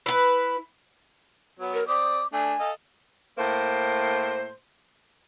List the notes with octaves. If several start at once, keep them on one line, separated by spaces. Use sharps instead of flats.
E4 B4
F#3 B3 C#5
A#4
C4 D5 D6 D#6
A3 D4 G#5
A4 D#5 F5
A2 A#3 C5